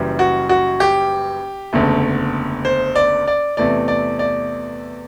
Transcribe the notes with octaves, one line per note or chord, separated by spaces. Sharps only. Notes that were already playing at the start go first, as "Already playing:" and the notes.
Already playing: F#1 F#2 E3 G3
F#4
F#4
G4
F#1 E2 D3 A3
C5
D5
D5
E2 C3 E3 A3 D5
D5
D5